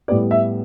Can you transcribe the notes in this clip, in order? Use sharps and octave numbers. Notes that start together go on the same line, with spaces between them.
A2 G3 B3 D5
E5